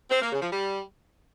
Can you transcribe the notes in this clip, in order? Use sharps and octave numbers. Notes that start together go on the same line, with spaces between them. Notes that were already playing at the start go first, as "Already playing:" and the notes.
C4
A#3
C#3
F3
G3